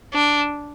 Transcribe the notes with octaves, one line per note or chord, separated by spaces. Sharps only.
D4